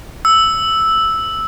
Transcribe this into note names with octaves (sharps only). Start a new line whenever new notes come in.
E6